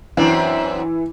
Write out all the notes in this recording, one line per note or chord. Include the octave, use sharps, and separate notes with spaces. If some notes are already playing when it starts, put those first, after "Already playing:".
F#2 E3 C4 D4